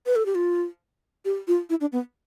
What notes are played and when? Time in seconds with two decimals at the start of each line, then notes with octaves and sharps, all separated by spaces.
0.06 B4
0.16 A4
0.26 G4
0.35 F4
1.25 G4
1.48 F4
1.70 E4
1.81 D4
1.92 B3